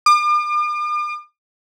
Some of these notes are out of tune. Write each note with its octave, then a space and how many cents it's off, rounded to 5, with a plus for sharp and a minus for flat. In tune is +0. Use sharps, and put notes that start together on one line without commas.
D6 +45